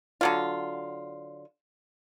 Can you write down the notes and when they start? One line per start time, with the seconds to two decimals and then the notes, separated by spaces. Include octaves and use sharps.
0.21 D3 F#3 F4